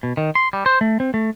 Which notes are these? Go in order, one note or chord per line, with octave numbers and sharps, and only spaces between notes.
B2
D#3
C6
G3
C5
A3
C4
A3